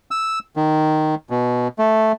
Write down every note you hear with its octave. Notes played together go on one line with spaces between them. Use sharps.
E6
D#3
B2
A3